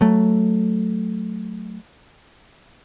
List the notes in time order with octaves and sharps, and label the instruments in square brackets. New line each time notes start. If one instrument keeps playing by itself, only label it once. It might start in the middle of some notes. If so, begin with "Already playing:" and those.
[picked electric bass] F#3 A3